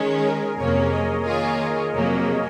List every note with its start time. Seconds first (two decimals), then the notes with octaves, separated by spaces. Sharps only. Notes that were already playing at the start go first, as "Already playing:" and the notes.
Already playing: D#3 G#3 C#4 G#4
0.23 A#4
0.57 F2 C3 F#3 A#3 C#4 C#5
0.91 D#5
1.25 D#3 A#3 F4 G#4
1.94 F2 C3 F#3 A#3